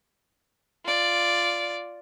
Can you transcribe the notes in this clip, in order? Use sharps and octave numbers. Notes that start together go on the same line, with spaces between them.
F4 D5